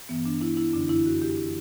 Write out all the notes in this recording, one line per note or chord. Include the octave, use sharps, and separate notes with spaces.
G2 E3 B3
D4
E4
E4
F#2 D3 D4
E4
F#4
G4
E4
E3